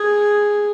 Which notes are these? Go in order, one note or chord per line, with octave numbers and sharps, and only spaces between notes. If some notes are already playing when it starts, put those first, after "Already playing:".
Already playing: G#4